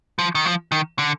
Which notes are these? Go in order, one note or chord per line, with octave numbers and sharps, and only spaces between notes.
F3
D#3
F3
D#3
D3